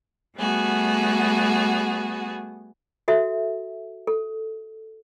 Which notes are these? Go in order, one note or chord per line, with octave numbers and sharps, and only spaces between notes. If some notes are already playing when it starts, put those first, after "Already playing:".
G3 A3 B3 F#4 G#4
F#4 A4 E5
A4